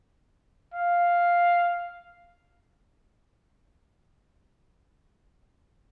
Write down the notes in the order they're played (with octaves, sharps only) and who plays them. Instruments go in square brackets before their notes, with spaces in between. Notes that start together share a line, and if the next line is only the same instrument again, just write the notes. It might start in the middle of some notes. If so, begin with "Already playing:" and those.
[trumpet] F5